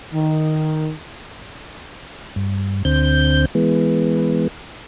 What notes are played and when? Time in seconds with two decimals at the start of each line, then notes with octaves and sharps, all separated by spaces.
0.14 D#3
2.36 G2
2.85 D2 D3 C4 G6
3.55 E3 G#3 B3